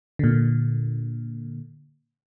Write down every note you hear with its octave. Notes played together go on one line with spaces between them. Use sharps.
A#2 D3